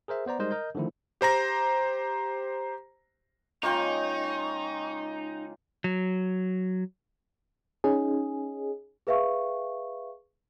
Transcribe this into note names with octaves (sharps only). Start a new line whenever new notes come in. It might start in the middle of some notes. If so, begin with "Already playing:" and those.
G#4 A#4 C5 E5
B3 C5 D5 A#5
G3 G#3 D#4 A#4 C5 D#5
A#4 D#5 G6
D3 D#3 F3 A3 E4
G4 C5 A#5 A#6
C#3 G#3 A#3 D#4 F4 G5 C#6
F#3
C#4 D#4 G#4
G#4 B4 E5 F5 C#6